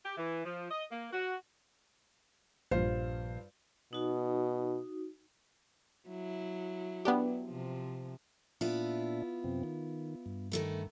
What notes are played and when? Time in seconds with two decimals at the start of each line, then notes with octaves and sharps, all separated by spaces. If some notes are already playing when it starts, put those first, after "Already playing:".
0.05 G4
0.17 E3
0.45 F3
0.71 D#5
0.91 A#3
1.13 F#4
2.71 A#1 G2 F4 C5
3.93 B2 D#4 F#4
6.08 F#3 E4
7.05 B3 D4 G4
7.47 C3 F3
8.61 A#2 B3 D4 E4 F4 E5
9.44 F#2 C3 C4
9.64 D#3
10.26 G2
10.52 D#3 A3 B3